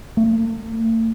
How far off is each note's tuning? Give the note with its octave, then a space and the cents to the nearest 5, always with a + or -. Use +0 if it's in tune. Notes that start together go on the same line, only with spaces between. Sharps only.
A3 +45